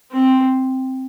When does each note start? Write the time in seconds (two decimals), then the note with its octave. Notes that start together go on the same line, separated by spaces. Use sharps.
0.12 C4